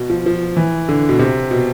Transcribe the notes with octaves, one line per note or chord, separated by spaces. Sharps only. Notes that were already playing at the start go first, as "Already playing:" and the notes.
Already playing: B2
F3
F3
E3
D3
B2
C3
B2